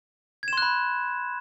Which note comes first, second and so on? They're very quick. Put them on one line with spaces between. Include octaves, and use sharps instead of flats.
G#6 E7 C6 F#6 B5